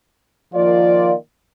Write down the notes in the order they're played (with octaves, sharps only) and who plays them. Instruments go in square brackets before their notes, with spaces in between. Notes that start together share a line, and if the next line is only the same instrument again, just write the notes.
[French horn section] D#3 A#3 D5 [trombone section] F3 F4